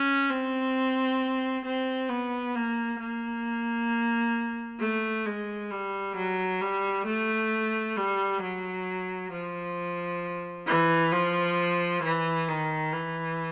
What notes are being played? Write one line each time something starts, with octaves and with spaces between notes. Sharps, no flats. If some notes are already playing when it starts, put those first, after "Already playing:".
Already playing: C#4
C4
C4
B3
A#3
A#3
A3
G#3
G3
F#3
G3
A3
G3
F#3
F3
E3
F3
E3
D#3
E3